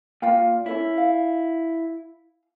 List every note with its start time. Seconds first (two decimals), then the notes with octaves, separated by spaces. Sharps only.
0.22 A#2 F4 F5 G5
0.66 C#4 E4 A4 C#5
0.97 F5